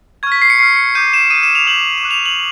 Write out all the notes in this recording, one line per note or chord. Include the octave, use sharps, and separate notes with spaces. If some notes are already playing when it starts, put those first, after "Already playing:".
C#6 F6 G#6
B6
C7
C#7
C#6 F6 C7
C#7
D6 G6 D#7
E7
D#6 G6 D#7
E7
F7
D6 G6 F#7
E7
D6 F#6
F7
F#7